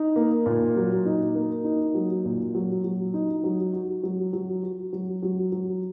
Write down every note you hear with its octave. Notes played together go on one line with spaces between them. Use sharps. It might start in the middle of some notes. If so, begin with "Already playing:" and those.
Already playing: D#4
A#3
A#2
F#3
D#4
A#3
D#4
F#3
A#2
F#3
F#3
D#4
F#3
F#4
F#3
F#3
F#4
F#3
F#3
F#3